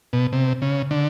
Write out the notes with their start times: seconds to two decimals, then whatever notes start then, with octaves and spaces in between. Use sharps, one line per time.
0.13 B2
0.33 C3
0.62 C#3
0.91 D3